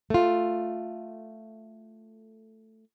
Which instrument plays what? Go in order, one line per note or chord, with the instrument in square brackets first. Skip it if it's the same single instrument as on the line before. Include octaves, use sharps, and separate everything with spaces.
[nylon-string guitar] A3 F4